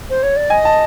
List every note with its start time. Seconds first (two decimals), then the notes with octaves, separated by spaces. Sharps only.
0.09 C5
0.22 C#5
0.36 D5
0.50 D#5 G#5
0.65 A5